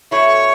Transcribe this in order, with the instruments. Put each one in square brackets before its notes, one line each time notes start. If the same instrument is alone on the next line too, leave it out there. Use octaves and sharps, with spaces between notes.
[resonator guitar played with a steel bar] B2 A3 E4 [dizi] C#5